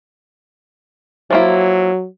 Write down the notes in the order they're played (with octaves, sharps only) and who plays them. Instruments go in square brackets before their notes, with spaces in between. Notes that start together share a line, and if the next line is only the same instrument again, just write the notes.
[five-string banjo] F3 A#3 E4 [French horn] F#3